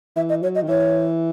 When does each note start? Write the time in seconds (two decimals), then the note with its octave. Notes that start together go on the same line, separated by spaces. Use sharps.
0.16 E3 E5
0.29 D#5
0.42 F#3 C#5
0.55 D#5
0.63 D#3
0.68 E3 C#5